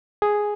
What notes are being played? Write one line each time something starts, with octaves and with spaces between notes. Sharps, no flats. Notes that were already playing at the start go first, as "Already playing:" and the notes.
G#4